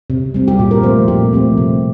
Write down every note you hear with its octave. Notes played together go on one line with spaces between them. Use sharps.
C3
G3 C4
G4
A#2 F4
A#4
F3 A3 C4 C5
A#2 G4
F3 A3 C4
C3